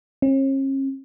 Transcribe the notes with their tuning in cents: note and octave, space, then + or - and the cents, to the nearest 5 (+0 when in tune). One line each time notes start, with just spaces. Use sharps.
C#4 -45